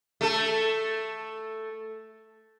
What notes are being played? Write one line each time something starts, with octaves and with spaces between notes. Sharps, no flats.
A3 A4